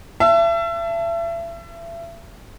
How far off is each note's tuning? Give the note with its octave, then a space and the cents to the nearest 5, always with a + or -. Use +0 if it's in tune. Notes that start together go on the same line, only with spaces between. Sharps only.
E5 +35 A5 +0